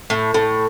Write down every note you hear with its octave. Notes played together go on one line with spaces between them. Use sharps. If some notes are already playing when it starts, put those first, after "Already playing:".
A2
A2